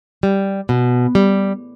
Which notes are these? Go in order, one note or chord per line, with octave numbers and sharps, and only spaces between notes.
G3
B2
G3